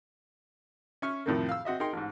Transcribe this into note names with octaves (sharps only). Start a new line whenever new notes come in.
C#4 E5 C#6 F6
F2 A2 C3 D#3 A3 A#3
F5 E6
C4 F#4 D#5 E5
D#4 G#4 A#4 G5 C6
A1 G#2